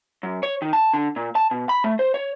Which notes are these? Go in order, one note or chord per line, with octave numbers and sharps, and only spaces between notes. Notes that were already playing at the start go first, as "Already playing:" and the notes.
F#2
C#5
D#3
A5
D3
A#2
A5
B2
B5
A3
C5
C#5